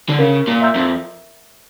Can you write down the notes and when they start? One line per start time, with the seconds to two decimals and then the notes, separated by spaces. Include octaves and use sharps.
0.09 D3
0.19 C#3 A#4
0.48 A#2
0.61 E5 A#5 E6 G6
0.76 F2